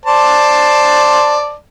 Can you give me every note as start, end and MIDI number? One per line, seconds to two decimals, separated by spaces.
0.06 1.55 72
0.06 1.55 74
0.06 1.55 81